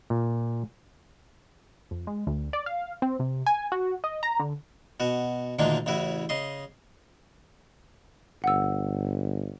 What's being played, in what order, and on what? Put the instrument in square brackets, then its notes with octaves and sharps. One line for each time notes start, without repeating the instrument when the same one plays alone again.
[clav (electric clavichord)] A#2
[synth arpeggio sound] F2
G#3
D2
D5
F5
C4
C3
G#5
F#4
D#5
A#5
D3
[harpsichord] B2 F#4
D2 A#2 D3 D#3 G#3 D4
A1 C#3 E4 F#4
C#3 D#5 C6
[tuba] G1 [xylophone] F#5 E6